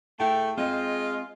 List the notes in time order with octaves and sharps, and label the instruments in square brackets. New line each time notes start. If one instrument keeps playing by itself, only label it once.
[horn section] A3 [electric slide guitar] E4 G#4 G5
[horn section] G#3 F4 [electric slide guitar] C4 D#5